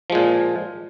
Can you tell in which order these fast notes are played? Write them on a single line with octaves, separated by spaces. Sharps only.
F3 G#3 A#2